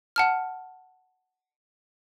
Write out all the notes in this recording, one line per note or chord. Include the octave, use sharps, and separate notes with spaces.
F#5 A5 F6